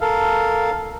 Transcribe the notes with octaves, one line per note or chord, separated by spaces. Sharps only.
A4 A#4 F5